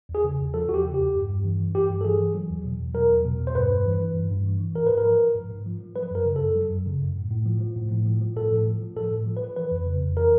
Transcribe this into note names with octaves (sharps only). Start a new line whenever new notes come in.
E2
G#4
C#3
E2
F3 A4
E2 F#4
G4
C#3
G4
E2
G2
G2
E3
E3
G2 G4
G2
A4
E3 G#4
E3
F#3
E2
B2
E2
F#3 A#4
E2
B2
E2
C5
G2 B4
G2
E3
E3
G2
G2
E3
E3
G#2 A#4
G#2 B4
A#4
F3
F3
G#2
G#2
F3
F3
F#3 B4
F#2 A#4
C#3
A4
F#2
F#3
F#2
C#3
F#2
A2
A2
F3
F3
A2
A2
F3
F3
A2 A4
A2
F3
F3
A2 A4
A2
F3
B4
F3
E3 B4
F2
C#3
F2
E3 A#4